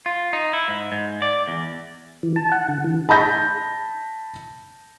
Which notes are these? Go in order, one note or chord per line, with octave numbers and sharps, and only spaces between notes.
F4
D#4
E4
G#2
G#2
D5
E2
E3
A5
F#5
D3
E3
A5 B5 G6 A#6